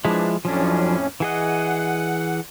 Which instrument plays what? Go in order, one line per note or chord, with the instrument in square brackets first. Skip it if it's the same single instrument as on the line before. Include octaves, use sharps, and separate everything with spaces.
[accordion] E3 D4 [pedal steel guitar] F3 G#3 E4
[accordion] F2 A2 C#4 [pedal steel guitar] F3 F#3 D4
[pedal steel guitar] E3 G#4 D#5 [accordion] F#5